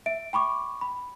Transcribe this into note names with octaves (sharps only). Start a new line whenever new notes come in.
E5 D7
G5 B5 C#6 D6
B5